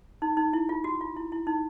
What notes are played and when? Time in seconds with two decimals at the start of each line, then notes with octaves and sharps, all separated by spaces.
0.22 D#4
0.37 D#4
0.53 E4
0.69 F4
0.84 F#4
1.01 F4
1.16 E4
1.32 E4
1.47 D#4